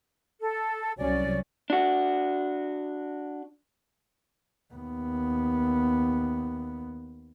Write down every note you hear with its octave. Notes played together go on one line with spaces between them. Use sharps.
A4
C2 F#3 C#4 D5
D4 F#4
D#2 B3